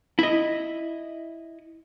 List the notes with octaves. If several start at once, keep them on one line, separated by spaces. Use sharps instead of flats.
E4 D#5